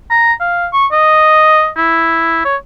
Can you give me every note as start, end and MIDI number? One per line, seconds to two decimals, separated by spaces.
0.11 0.33 82
0.40 0.67 77
0.73 0.86 85
0.92 1.68 75
1.77 2.43 64
2.45 2.56 73